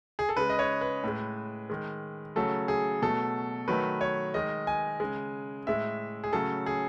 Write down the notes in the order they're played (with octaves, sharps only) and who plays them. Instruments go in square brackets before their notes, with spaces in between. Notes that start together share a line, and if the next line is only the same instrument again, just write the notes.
[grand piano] G#4
A4
C#3 G#3 B4
D#5
C#5
B4
A2 G#3
D#3 G#3
C#3 F#3 A3 A4
G#4
B2 F#3 A3 A4
D#3 F#3 A3 B4
C#5
D#3 G#3 D#5
G#5
C#3 G#3
A2 G#3 E5
G#4
C#3 F#3 A3 A4
G#4